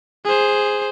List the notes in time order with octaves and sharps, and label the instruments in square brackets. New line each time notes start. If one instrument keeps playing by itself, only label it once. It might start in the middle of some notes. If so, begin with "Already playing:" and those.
[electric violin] G#4 C5